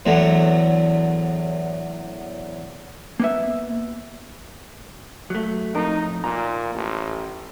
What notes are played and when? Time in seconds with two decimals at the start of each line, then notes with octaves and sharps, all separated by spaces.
0.06 E2 A2 D3 F#3 B3
3.20 A#3 B3 E5
5.30 F#3 A3
5.74 F2 A2 D#4 A#4
6.24 A#2 A#5
6.74 A1